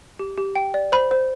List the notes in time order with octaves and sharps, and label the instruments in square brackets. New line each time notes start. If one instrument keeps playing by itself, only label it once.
[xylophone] G4
G4
G5
D5
C5 B5
C5